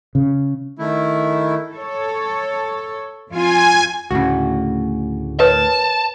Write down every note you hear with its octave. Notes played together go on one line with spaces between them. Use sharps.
C#3
D#3 A3 E4
A4 C#5
F2 F4 G#5
D2 A2 C#3 F#4
A#4 B4 C#5 A5